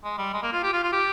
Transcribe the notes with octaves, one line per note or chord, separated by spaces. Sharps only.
G#3
G3
G#3
A#3
F4
G4
F4
F4
G4